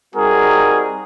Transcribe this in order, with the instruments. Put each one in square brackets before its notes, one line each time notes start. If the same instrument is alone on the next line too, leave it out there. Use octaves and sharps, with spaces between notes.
[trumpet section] G3 C4 D#4 F#4 G#4 A#4